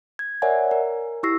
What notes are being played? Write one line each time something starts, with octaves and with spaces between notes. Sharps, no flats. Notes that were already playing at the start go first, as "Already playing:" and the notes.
G#6
A#4 C#5 D5 E5 F#5 G#5
A#4
E4 G4 C#6 E6 A#6 C7